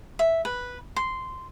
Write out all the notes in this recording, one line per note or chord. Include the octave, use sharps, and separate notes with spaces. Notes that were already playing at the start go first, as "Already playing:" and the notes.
E5
B4
C6